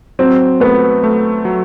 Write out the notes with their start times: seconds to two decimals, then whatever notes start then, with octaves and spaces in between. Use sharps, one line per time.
0.19 F#3 C4
0.60 A3 B3
1.04 A3
1.45 F#3